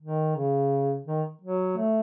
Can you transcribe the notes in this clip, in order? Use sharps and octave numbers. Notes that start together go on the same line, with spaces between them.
D#3
C#3
D#3
F#3
A3